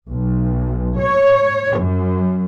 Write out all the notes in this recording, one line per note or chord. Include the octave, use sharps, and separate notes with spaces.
B1
C#5
F#2